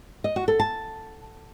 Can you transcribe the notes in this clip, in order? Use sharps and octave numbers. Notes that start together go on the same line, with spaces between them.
D#5
F#4
A4
A5